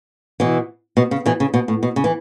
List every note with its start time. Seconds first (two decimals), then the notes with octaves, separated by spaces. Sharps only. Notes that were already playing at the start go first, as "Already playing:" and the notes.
0.40 B2 E3
0.97 B2
1.11 C#3
1.26 B2 E3
1.40 C#3
1.54 B2
1.68 A2
1.83 B2
1.96 C#3
2.04 E3